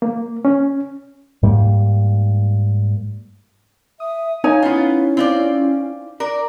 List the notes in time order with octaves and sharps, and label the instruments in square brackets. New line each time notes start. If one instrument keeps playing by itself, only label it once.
[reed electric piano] A#3
C#4
[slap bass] G#2 G3 A#3
[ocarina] E5 [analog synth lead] D#6
[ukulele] D#4 C#5 G#5 [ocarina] F5
[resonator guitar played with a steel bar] B3 F4 [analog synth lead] C#4 [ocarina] E4
[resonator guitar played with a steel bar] C4 F4 D5
A#4 D5